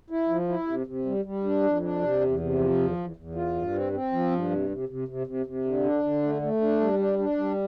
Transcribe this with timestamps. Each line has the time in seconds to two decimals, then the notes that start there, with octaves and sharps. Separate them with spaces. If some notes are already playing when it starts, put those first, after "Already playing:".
0.10 E4
0.29 F3
0.48 E4
0.67 C3
0.86 C3
1.06 G3
1.25 G3
1.44 D4
1.63 F2
1.82 D4
2.02 C3
2.21 E2
2.39 C3
2.59 F3
2.78 E2
2.97 E2
3.16 E2
3.35 F4
3.55 G2
3.74 C4
3.93 C4
4.12 F3
4.31 G2
4.50 C3
4.70 C3
4.89 C3
5.08 C3
5.27 C3
5.46 C3
5.65 D3
5.85 D4
6.03 D3
6.23 A3
6.42 A3
6.61 D4
6.81 G3
6.99 D4
7.19 D4
7.38 G3